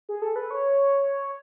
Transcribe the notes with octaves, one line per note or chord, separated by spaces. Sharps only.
G#4
A4
B4
C#5